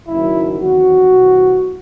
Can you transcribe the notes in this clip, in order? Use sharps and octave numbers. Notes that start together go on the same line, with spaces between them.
F#1 F#2 D#3 F#3 E4
E2 D#3 F#3 C4 F#4
C2 C3 E3